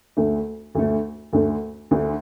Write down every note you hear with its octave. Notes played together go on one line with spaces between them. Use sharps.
D2 D3 A3
D2 D3 A3
D2 D3 A3
D2 D3 A3